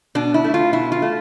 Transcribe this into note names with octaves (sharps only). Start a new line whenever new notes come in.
B2 D4
E4
A3
F4
B2 E4
F4
A3